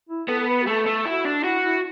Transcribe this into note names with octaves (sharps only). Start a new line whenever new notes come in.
E4
B3 A4
A4
B4
F#4
A3 A4
A3
E4 F#4
D4
E4 F#4
E4